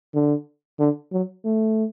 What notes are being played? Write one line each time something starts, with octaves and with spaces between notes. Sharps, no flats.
D3
D3
F#3
A3